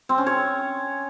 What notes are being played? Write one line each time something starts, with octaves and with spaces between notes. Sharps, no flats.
C4
C#4
C#5